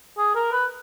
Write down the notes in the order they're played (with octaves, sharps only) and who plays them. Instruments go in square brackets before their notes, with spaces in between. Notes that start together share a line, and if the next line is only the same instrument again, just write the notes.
[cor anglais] G#4
A#4
B4